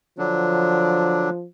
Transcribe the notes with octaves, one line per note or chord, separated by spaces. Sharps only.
D3 F3 F#3 D4